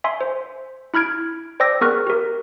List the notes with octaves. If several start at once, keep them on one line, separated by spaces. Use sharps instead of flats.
E5 G#5 C6
C5
E4 B5 F6 G#6 D7
C5 D5 G5 D6 E6 A#6
B3 G#4 A#4 C#6 F6 F#6
G4 A#4